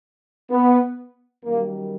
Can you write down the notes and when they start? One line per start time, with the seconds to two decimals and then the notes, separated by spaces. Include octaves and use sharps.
0.50 B3
1.44 F#2 D#3 G3 A#3